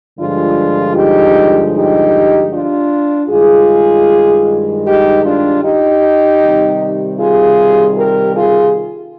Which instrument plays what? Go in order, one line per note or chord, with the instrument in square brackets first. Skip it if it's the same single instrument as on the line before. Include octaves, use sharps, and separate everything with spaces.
[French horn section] G2 D3 F3 G#3 D4 F4
D#4 G4
D#4 G4
D4 F4
G2 D#3 G#3 F4 G#4
D#4 G4
D4 F4
D#4 G4
C3 D#3 G3
F4 G#4
G4 A#4
F4 G#4